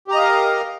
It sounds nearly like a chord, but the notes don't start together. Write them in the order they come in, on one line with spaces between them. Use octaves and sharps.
G4 A#5 D#5 F5 A#4